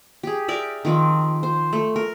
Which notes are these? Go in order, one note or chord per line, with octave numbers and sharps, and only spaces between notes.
G4 G#4
A#4 D5 E5
D#3 F3 C4
C5
A3
A#4